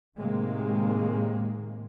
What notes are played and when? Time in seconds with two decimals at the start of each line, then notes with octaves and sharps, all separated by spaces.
0.19 A2 C3 D#3 G#3 A#3